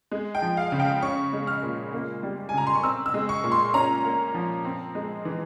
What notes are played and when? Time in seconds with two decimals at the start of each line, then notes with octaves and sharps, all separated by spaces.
0.12 G#3
0.35 G5
0.42 F3
0.57 F5
0.72 C#3
0.80 G5
1.02 C#4 C#6
1.33 G#3
1.47 F6
1.63 A#2
1.93 A#3
2.23 G3
2.49 G#5
2.54 C#3 A#5
2.67 C6
2.75 C#6
2.83 C4 E6
3.06 E6
3.14 G#3
3.29 C#6
3.44 A#2
3.52 C6
3.74 C#4 A#5
4.04 A#3
4.35 F3
4.65 C4
4.95 G#3
5.25 E3